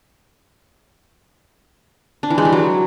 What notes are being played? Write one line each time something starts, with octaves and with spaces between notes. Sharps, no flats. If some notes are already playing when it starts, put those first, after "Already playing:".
D4
E3
G#3
G3
F#3